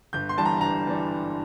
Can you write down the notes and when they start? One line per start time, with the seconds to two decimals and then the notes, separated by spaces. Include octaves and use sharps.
0.13 G1 G6
0.29 C6
0.37 G2 E3 G3 D4 A5
0.45 A#5
0.61 G1 A#5
0.87 E3 G3 D4